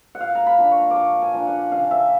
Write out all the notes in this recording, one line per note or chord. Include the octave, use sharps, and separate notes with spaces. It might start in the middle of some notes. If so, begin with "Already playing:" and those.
F#5
A#2 F5
A#5
B5
F3 A#3 D4
C#6
D6
A#2 C#6
G#5
F3 A#3 D4
F#5
C#3 F5
E5